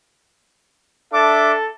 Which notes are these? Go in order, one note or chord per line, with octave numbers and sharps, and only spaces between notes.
D4 A4 E5 D6